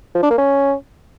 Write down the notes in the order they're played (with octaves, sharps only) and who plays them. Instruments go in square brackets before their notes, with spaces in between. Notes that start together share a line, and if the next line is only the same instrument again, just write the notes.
[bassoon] F3
D4
A#3
C#4